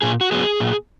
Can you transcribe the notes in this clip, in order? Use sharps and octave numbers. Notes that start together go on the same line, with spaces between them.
A#2 G#4
F#4
F#3 B3 G#4
A#2